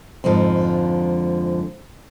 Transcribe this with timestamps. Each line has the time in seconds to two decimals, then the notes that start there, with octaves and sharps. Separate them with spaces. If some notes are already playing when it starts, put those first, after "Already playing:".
0.24 F2 G#2 D3 F3